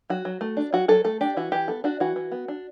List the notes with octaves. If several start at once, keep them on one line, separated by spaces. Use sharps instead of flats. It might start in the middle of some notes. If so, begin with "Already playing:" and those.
F#3 F#4
F#3
A3
D4
F#3 F#4
F#3 A4
A3 A4
D4 G4
E3 F#4
E3 G4
B3 A4
D4 F#4
E3 F#4
E3
B3
D4